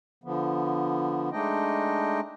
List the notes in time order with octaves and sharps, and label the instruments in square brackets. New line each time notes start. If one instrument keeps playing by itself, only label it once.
[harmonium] D3 F3 B3
G#3 A3 D4 D#4 D#5 G5